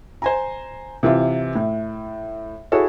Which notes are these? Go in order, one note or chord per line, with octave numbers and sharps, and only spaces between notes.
C5 G#5 A#5
C3 E3 F4
A2
E4 F#4 G#4 A4 C#5